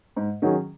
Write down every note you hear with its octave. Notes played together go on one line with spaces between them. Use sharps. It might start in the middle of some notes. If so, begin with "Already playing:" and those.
G#2
D#3 F#3 C#4 G#4